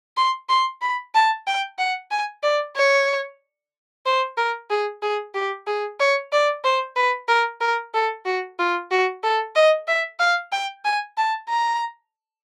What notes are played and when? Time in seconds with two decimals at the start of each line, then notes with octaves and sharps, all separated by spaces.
0.17 C6
0.49 C6
0.82 B5
1.15 A5
1.47 G5
1.79 F#5
2.11 G#5
2.43 D5
2.77 C#5
4.06 C5
4.38 A#4
4.70 G#4
5.02 G#4
5.35 G4
5.67 G#4
6.00 C#5
6.32 D5
6.64 C5
6.96 B4
7.28 A#4
7.61 A#4
7.94 A4
8.25 F#4
8.59 F4
8.91 F#4
9.23 A4
9.56 D#5
9.88 E5
10.20 F5
10.52 G5
10.85 G#5
11.18 A5
11.49 A#5